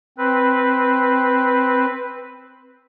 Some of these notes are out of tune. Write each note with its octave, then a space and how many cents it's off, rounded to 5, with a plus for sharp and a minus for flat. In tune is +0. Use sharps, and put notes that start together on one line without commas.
C4 +0 B4 +0